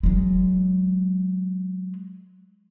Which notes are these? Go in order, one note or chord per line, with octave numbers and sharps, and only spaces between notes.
F#3 G#3